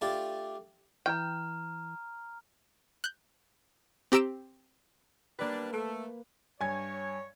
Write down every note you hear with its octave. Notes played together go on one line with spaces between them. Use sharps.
A3 D4 F4 G4 A4
E3 G5 A#5 F6
F#6 G6
C4 G4 A#5 E6 D7 E7
G3 A#3 D4 B4
A3 A4
G2 C#5 G#5 G#6